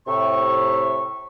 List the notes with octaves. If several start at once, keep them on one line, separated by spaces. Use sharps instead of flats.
A2 C3 E5 C#6